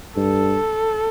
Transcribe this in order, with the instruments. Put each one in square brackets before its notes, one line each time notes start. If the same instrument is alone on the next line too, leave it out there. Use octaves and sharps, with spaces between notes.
[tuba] G2 [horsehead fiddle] A4